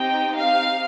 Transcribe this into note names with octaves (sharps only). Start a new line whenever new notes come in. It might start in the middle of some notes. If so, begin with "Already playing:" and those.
Already playing: C4 D#4 G4 G5
F5